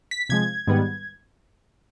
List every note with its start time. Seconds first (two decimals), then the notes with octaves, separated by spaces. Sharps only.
0.11 B6
0.29 C3 F3 G#3 G#6
0.67 G#2 D#3 G3 B3